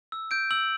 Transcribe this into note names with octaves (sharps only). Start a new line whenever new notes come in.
E6
G6 D7
E6 F#7